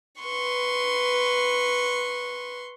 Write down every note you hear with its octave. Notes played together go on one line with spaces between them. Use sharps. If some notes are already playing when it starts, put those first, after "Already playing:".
B4 C6 C#6